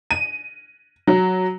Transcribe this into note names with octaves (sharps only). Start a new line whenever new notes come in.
D#7
F#3